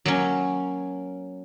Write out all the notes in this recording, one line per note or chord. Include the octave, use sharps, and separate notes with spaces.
F#3 A#3 C#4